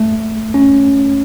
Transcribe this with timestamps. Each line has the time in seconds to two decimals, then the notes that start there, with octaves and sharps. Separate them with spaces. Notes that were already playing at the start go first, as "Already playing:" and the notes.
Already playing: A3
0.54 C#4